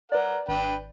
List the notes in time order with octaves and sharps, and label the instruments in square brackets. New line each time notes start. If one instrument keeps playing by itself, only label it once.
[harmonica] A#4 F#5 [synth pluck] B4 D5
[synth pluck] G#1 [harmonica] D4 B4 G5